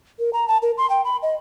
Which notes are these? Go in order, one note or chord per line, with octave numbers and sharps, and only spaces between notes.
A#4
A#5
A5
A#4
C6
G5
B5
D#5